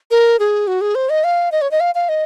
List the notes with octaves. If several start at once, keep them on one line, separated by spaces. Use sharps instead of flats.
A#4
G#4
F#4
G#4
C5
D#5
F5
D#5
C#5
D#5
F5
F5
D#5